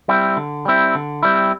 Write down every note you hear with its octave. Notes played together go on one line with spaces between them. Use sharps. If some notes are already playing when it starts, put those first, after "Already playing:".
G3 C4 E4
D3
G3 C4 E4
D3
G3 C4 E4